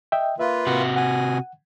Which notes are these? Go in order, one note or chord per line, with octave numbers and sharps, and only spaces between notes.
D#5 E5 G5
A#3 F4 B4 E5
C3 F#4
F#5 G#5